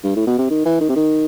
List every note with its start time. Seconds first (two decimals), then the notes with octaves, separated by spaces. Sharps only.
0.04 G2
0.16 A2
0.27 B2
0.38 C3
0.50 D#3
0.65 E3
0.80 D#3
0.89 C3
0.96 D#3